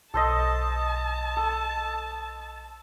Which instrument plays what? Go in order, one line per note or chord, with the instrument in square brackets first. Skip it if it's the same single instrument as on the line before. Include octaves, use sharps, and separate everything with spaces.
[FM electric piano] B1 [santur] A4 C5 D#5 [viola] A5
[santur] A4